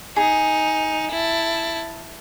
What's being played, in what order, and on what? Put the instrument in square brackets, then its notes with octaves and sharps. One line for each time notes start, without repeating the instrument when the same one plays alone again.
[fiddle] D#4 [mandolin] G#4
[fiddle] E4 A5